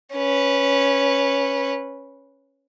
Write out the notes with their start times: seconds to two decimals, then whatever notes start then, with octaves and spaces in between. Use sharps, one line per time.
0.14 C#4 B4